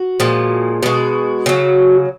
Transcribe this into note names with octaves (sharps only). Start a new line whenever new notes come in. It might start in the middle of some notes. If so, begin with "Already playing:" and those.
Already playing: F#4
A#2 F3 G#3
B2 G#3 F#4
C#3 F#3